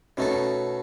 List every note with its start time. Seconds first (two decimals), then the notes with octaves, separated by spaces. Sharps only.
0.17 B2 A3 C#4 D#4 A4